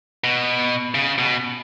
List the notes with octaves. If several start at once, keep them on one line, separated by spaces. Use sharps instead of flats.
B2
C#3
B2